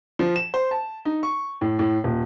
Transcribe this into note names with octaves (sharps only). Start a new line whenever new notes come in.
F3
E7
C5
A5
D#4
C#6
A2
A2
D#1